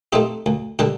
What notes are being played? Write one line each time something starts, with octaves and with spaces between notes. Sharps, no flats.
A3 C4 D#4 G4
D2
D3 G3 D4 G4